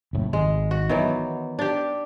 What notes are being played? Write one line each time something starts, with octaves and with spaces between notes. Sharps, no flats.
F#1 A2
G#1 G#3
F#4
D#3 E3 F#3 B3
D4 G4